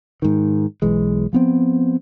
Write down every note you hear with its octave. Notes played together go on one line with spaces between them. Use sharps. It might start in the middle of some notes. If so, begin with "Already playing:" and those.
G#2 D#3
B1 E3 G#3
F3 B3 C4